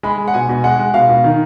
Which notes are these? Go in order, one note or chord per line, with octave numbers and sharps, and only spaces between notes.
G#3 B5
G#3
F#5
B2 G#5
B2
G#3 F#5
G#3
B2 F5
B2
D#3